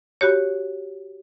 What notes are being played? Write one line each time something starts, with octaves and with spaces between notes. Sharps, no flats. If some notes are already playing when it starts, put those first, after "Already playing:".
F#4 G4 C#5